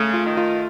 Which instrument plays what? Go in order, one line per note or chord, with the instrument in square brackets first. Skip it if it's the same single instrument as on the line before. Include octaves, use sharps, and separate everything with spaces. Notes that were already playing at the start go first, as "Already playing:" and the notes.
Already playing: [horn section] C#3 [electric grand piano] A3
[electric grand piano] F4
[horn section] D#3
[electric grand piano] F4